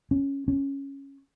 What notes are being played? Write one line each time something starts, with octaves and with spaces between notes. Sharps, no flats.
C#4
C#4